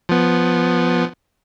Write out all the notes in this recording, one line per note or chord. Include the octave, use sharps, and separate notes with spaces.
F3 B3